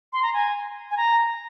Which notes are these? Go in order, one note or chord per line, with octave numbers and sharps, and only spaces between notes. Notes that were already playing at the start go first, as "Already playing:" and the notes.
C6
A#5
G#5
G#5
A#5